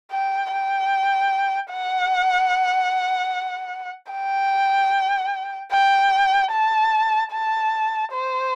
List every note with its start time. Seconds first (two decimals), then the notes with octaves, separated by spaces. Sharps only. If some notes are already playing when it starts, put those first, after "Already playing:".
0.12 G5
0.52 G5
1.72 F#5
4.12 G5
5.72 G5
6.52 A5
7.33 A5
8.12 C5